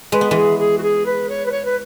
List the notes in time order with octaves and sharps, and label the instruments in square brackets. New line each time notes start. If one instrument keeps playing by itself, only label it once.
[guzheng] G#3 [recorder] B4
[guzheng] B3
[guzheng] E3 G#3 [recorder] G#4
[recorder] G#4
F#4
G#4
B4
C#5
B4
C#5
B4